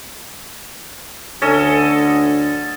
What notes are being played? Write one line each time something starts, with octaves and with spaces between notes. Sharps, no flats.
D2 D3 C#4 A4 D#5